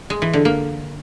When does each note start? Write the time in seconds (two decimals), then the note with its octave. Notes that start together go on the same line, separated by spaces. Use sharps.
0.10 G#3
0.22 E3
0.33 D3
0.45 A#3